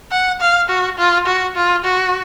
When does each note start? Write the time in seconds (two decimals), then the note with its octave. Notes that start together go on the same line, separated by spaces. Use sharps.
0.12 F#5
0.41 F5
0.69 F#4
0.97 F4
1.26 F#4
1.56 F4
1.84 F#4